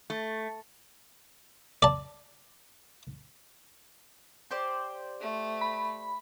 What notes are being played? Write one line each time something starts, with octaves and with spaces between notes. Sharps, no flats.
A3
D5 A5
G4 C5 D5
A3
B5